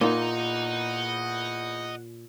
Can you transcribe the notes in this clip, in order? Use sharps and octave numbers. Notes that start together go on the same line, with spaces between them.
E2 A#2 A#3 D#4 D#5 F#5 A#5